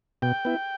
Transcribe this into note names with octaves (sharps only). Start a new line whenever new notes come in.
B2 G5
B3 E4